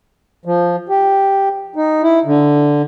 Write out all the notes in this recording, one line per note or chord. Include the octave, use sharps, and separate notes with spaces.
F3
G4
D#4
E4
D3